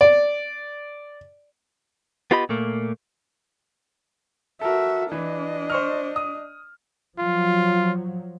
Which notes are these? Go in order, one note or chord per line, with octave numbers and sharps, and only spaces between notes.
D5
B3 F4 G4 D#5 B5
A#2 A3 A#3
F#4 A4 A#4 E5
E3 D4 D#5
C5 C#6 F6
D#6
F3 F#3 F4